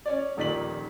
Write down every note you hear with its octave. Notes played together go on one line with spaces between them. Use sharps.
C#4 C#5 D5
D#1 A#1 D#3 D5 B6 F#7